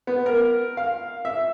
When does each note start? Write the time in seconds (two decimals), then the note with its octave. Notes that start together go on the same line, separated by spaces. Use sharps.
0.07 B3
0.26 A#4
0.77 F5
1.25 E5